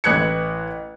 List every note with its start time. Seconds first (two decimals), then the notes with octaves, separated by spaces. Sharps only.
0.04 A1 B4 F#6 G#6 C#7